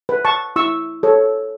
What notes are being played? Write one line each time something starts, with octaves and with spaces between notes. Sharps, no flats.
B4
A5 C#6
E4 C#6 E6
A4 C#5